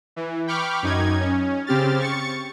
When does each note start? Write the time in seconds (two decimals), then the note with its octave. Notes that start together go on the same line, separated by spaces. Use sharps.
0.16 E3
0.47 G5 B5 C#6 D6 F6
0.83 F#2 D#4 G#6
1.20 C#4
1.67 C#3 C4 G4 F6 A6
2.00 C#6 A6 C#7